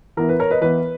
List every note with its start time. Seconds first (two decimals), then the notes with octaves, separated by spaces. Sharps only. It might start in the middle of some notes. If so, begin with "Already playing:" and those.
0.17 E3 B3 E4 A#4
0.29 B4
0.39 A#4 C#5
0.51 B4 D#5
0.61 E3 B3 E4 B4